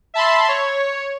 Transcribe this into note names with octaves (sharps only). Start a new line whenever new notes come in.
E5 A5 B5 C6
C#5